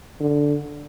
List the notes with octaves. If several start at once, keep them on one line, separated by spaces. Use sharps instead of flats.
D3